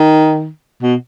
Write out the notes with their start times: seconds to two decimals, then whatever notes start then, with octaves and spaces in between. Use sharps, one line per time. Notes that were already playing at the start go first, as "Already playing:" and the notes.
Already playing: D#3
0.83 B2